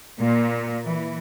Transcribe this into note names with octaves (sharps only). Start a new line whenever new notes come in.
A#2
E3